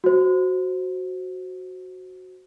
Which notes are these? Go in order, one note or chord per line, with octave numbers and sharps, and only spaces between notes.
F#4 C5